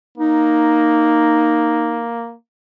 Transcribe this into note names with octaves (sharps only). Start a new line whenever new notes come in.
A#3 D#4